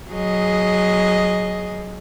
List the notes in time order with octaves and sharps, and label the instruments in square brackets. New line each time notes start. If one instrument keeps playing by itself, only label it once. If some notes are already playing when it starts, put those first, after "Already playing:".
[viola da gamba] F#3 G#4 D#5